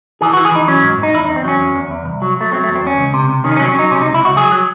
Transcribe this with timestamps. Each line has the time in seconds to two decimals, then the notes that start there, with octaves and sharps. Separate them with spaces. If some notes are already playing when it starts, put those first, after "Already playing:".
0.21 E3 G#4
0.33 F#4
0.37 E3
0.45 G#4
0.52 E3 D#4
0.67 F#3 C#4
0.83 G#2
0.98 G#2
1.03 D#4
1.14 E2 E4
1.25 D#4
1.29 E2
1.36 C4
1.44 F#3 C#4
1.60 E2
1.76 E2
1.91 E2
2.06 C2
2.22 F#3
2.37 F#3 A3
2.52 F#3 C4
2.64 A3
2.68 E2
2.75 C4
2.83 E2 C#4
2.98 C#2
3.14 C3
3.29 C3
3.44 D#3 C#4
3.51 D#4
3.56 C#4
3.59 F#3 C4
3.68 C#4
3.75 F#3 D#4
3.91 C3 C#4
4.02 D#4
4.06 C#2
4.14 E4
4.22 C#2 F#4
4.37 F#3 G#4
4.52 F#3